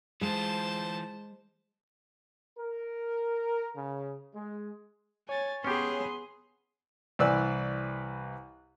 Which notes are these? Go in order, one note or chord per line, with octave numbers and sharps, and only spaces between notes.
E3 G#3 F4 C5 A5
A#4
C#3
G#3
C#5 G#5 A6
B3 C#4 G4 G#4 C6
C2 E3 B4 D5 E6